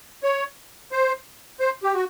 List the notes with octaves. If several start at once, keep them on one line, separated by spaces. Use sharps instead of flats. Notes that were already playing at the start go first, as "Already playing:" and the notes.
C#5
C5
C5
G4
F#4